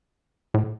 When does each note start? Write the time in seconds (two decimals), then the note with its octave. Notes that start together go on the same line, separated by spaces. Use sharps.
0.54 A2